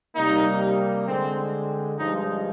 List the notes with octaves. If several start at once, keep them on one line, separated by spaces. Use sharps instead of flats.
C3 G3 A#3 D#4
D3 G#3 C4
G2 F3 G#3 D#4